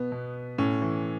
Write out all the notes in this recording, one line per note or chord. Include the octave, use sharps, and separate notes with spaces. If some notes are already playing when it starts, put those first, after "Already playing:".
Already playing: B2 B3
B2
A2 C#4
E3